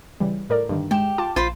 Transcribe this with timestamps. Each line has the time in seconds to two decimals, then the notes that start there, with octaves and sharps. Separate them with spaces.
0.20 C#3 E3 G3
0.49 A2 A#4 D5
0.69 G2 D3 D#3
0.91 G#3 G4 G6 E7
1.18 F4 A5 D6
1.36 A#1 F4 C5 B5